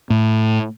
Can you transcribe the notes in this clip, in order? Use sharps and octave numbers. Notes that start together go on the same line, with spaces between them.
A2